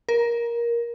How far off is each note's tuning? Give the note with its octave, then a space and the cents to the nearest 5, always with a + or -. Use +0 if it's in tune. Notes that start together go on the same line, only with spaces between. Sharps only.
A#4 +15